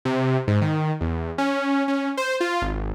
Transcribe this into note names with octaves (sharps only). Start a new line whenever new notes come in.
C3
G#2
D#3
E2
C#4
C#4
C5
F4
G#1